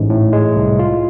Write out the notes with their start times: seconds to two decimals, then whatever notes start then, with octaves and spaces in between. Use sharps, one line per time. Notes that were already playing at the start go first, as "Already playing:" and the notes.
Already playing: A1 G#2
0.10 A2
0.33 G#3
0.56 C2
0.79 F4